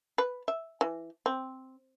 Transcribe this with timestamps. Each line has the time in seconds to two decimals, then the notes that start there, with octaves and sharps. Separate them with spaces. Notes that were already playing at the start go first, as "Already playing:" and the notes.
0.18 B4
0.48 E5
0.81 E3
1.26 C4